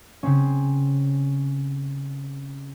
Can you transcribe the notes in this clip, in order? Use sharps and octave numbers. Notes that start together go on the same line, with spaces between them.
C#3 C4 C#4